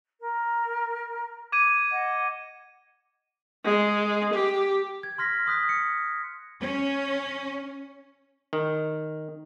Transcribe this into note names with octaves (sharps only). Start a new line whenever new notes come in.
A#4
D6 G#6 D#7
D#5 F#5
G#3
G4
G#6
C6 F6 A#6 B6
C6 D#6 F#6 B6
C#7
C#4
D#3